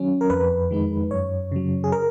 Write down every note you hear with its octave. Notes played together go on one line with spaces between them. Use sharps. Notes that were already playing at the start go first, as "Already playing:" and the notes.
Already playing: D#3 F#3 C#4
A#4
F2 B4
D#3 G#3 D#4
F#2 C#5
C#3 F#3
G#4
A#4